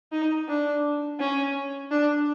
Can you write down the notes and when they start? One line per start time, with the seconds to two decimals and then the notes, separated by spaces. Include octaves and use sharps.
0.12 D#4
0.48 D4
1.19 C#4
1.91 D4